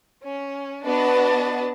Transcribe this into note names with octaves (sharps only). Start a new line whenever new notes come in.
C#4
B3 D4 F#4 B4 D#5 A5